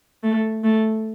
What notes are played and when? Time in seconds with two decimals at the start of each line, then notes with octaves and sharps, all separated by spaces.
0.23 A3
0.63 A3